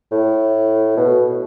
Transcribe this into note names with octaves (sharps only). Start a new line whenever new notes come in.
A2
B2